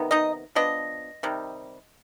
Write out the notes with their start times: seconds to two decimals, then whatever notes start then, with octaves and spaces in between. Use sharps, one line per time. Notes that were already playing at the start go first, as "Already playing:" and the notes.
Already playing: C3 D#3 B3
0.11 D#4 D#5
0.55 F3 B3 D4 D#5
1.23 C3 D#3 G3